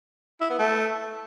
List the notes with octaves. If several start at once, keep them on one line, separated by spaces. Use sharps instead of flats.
E4
B3
A3